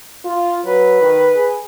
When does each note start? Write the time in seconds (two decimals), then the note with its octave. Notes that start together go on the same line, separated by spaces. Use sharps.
0.24 F4
0.64 F#3 B4
1.01 D#3
1.36 G#4